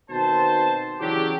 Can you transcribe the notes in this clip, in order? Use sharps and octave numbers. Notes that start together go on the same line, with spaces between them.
B2 D#3 C4 C5 A5
C#3 E3 F#3 D4 G4